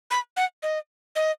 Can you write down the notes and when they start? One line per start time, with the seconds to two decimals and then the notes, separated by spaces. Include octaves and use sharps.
0.11 B5
0.37 F#5
0.63 D#5
1.16 D#5